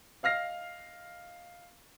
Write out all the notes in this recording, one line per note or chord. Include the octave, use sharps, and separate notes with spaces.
D#5 F5 F6 A#6 C7